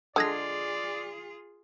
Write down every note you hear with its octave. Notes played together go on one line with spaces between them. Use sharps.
D3 G#3 F4 G#4 D5 D#6 G#6 A#6